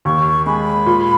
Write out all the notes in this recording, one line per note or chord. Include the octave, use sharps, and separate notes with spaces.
D#2 C#6
G#3 B5
A#2